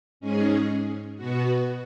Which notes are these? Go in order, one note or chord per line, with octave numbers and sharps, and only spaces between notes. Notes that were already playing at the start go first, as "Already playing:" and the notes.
G#2 G#3 C#4 G#4
B2 B3 F#4